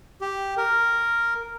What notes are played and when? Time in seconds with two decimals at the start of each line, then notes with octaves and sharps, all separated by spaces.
0.21 G4
0.57 A#4